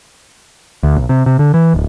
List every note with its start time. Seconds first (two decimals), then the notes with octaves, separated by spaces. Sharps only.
0.83 D2
0.96 B1
1.09 C3
1.26 C3
1.39 D3
1.54 E3
1.74 D1